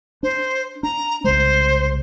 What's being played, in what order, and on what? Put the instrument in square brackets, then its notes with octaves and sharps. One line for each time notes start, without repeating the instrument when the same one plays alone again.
[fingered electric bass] D4 [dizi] C5
[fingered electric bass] D4 [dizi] A#5
[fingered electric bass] C2 C#3 G#3 [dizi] C5